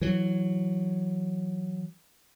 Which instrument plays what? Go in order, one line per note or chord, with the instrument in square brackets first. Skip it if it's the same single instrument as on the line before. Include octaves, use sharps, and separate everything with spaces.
[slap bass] E3 F#3